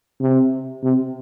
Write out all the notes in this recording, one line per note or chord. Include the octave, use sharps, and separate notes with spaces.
C3
C3